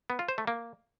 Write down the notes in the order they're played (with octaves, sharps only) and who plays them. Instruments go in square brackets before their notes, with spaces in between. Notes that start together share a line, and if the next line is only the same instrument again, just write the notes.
[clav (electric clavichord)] B3
F4
C5
A3
A#3